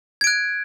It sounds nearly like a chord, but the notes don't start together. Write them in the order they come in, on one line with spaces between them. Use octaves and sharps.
G#6 D7 F#6